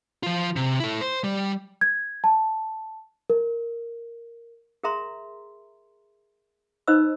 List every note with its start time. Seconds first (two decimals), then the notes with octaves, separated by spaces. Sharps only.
0.23 F3 F4
0.56 C3
0.80 E4 A4
1.01 C5
1.24 G3
1.81 G#6
2.24 A5
3.30 A#4
4.84 G#4 A#4 E5 A#5 C6
6.87 D#4 B4 C5 D#5 B5 E6